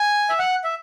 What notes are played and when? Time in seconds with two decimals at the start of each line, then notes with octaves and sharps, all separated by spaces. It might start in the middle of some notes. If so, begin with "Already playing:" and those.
Already playing: G#5
0.29 E5
0.39 F#5
0.64 E5